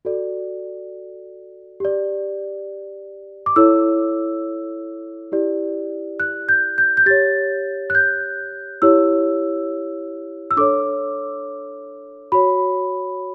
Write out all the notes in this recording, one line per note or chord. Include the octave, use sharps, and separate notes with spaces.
F#4 A4 D5
G4 D5
D6
E4 A4 C#5 E6
E4 G4 D5
F#6
G6
G6
G6
G4 C#5 A6
F#6
G6
E4 G4 C#5 E6
E6
D4 A4 C#5 D6
F#4 C#5 B5